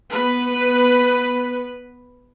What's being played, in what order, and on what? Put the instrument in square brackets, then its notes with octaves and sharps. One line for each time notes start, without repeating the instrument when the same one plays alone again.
[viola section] B3 B4